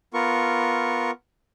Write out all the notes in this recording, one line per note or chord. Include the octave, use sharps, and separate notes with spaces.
B3 F4 A#4 C#6